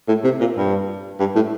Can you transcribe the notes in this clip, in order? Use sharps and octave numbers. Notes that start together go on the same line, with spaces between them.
A2
C3
A#2
G2
G2
A2